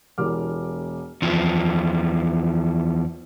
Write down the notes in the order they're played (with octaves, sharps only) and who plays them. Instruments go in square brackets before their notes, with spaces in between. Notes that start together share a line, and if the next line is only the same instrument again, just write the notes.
[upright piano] E1 E2 G4 A#4 D6 F6
[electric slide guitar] E2 F3